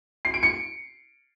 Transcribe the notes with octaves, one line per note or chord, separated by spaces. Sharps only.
C7
D7
C#7